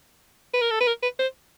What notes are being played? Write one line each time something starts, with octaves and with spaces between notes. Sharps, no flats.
B4
A#4
A4
B4
A#4
B4
C5